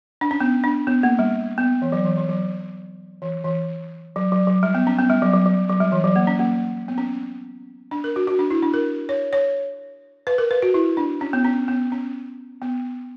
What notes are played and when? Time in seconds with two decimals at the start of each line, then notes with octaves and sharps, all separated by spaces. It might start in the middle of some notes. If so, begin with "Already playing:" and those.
0.21 D4
0.31 C#4
0.40 B3
0.63 D4
0.87 B3
1.03 A#3
1.19 G3
1.58 B3
1.82 E3
1.92 F#3
2.05 E3
2.17 E3
2.29 F#3
3.22 E3
3.44 E3
4.16 F#3
4.32 F#3
4.47 F#3
4.63 G3
4.75 B3
4.87 C#4
4.99 B3
5.10 G3
5.22 F#3
5.33 F#3
5.46 F#3
5.69 F#3
5.81 G3
5.92 E3
6.04 F#3
6.16 A#3
6.27 C#4
6.39 A#3
6.88 B3
6.98 C#4
7.91 D4
8.04 A#4
8.16 F#4
8.28 F#4
8.39 D4
8.50 E4
8.62 D4
8.74 A#4
9.09 C#5
9.33 C#5
10.27 B4
10.38 A#4
10.51 B4
10.62 F#4
10.74 E4
10.97 D4
11.21 C#4
11.33 B3
11.45 C#4
11.68 B3
11.92 C#4
12.62 B3